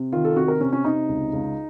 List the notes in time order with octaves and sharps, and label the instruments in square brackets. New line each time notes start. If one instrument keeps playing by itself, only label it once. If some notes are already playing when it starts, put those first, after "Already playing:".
Already playing: [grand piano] C3
D#3 F4
A4
C3 F#4
A#4
C3 C#4
C#4
C3 D#4
C#2
C#2